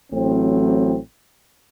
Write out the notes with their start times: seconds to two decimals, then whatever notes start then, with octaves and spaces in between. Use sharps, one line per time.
0.12 A1 A2 F#3 C4